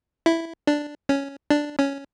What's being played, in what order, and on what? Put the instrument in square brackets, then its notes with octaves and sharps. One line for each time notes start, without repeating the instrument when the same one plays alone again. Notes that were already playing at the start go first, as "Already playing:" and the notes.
[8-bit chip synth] E4
D4
C#4
D4
C#4